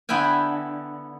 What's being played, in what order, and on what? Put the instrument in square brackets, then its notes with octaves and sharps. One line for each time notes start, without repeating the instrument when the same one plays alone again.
[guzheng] D3 B3 E4 E5 G5 G#5